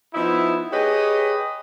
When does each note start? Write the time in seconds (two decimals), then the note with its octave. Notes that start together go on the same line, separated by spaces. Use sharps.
0.14 F3 B3 D#4 E4
0.72 G4 G#4 B4 C#5 D#5